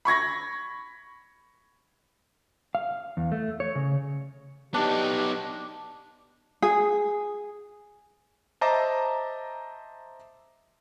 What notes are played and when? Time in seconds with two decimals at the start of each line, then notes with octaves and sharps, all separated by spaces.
0.05 B5 C#6 G#6 A#6
2.75 F5
3.17 E2
3.32 A3
3.60 C#5
3.75 C#3
4.74 B3 D4 D#4 G4 D6
6.62 G#4
8.61 C5 D#5 E5 A5 A#5 D6